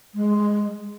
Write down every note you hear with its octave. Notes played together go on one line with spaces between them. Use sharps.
G#3